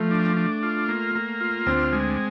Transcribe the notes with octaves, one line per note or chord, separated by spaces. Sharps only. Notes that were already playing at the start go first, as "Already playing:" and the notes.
Already playing: F3 A3
D4
D4
F4
A#3
A#3
F4
D2 C4
G#3